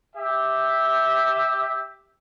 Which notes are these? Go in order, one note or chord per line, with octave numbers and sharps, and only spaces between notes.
G4 E5